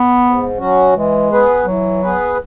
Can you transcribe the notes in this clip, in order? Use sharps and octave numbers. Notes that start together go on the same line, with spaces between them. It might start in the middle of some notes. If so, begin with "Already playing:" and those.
Already playing: B3
G#2
F#3 C#4 F#4
E3 G#3
B3 G#4 B4
E3 F#3
B3 G#4 B4